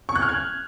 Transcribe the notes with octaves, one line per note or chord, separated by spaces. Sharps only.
C#6
F#6
F6
G#6